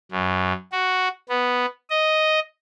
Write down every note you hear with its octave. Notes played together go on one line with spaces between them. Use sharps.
F#2
F#4
B3
D#5